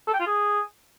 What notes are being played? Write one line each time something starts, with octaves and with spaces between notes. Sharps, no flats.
A4
G5
F4
G#4